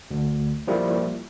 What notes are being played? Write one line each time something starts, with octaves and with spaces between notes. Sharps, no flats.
D2
F3 G3 A#3 E4 F4